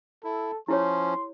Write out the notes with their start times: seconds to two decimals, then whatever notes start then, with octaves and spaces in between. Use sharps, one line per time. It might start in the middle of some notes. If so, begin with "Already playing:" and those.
0.24 E4 A4
0.68 F3 C#4 E4 G4 C#5 C6